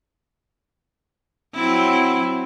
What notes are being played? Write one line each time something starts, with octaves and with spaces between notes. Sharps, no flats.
F#3 C4 E4